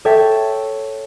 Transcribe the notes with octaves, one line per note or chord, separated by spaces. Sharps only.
A4 C#5 E5 G5